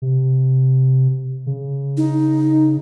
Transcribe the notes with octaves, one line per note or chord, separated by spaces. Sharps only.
C3
C#3
D#4